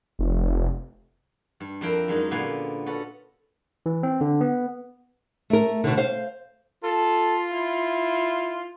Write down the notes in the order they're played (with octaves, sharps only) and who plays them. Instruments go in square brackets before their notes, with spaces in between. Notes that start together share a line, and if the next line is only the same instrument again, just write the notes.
[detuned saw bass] F1
[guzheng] G2
F2 D4 E4 A#4 F5 G5
F#2 G#3 D#4 D#5
A#2 D3 B3 B4 F5 G#5
C#4 F#4 A4 B4
[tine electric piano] E3
C4
D3
B3
[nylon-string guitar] A3 A#4
B2 D3
C5 F5
[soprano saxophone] F4 [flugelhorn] A4
[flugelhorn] E4